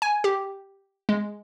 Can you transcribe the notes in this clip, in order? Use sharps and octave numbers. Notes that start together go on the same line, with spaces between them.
G#5
G4
G#3